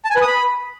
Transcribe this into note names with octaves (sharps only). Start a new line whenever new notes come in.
A5
G#5
B4
D#6
B5